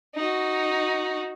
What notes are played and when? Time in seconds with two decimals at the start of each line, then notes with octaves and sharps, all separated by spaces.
0.15 D#4 F#4